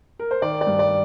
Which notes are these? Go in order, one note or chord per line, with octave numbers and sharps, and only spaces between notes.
A#4
C5
D#3 D5
D5
G2
D5